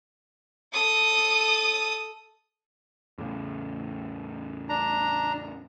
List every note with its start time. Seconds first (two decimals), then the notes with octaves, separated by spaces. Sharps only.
0.72 A4 D#6
3.18 E2 A2 C#3
4.69 D4 A#5